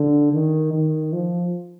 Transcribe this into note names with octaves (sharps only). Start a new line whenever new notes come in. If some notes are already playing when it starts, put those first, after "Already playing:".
Already playing: D3
D#3
D#3
F3